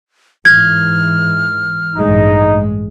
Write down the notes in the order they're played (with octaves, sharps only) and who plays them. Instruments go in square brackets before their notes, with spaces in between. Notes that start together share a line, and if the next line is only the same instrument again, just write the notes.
[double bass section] G#2 E3 [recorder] F6 [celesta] G#6
[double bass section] A1 G2 G#3 [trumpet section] D#4